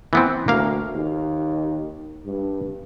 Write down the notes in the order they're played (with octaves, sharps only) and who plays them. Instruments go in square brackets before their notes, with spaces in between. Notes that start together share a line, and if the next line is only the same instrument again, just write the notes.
[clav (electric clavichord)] E3 B3 C4
[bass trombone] D2 [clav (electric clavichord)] A#3 F5
[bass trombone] D#2
G2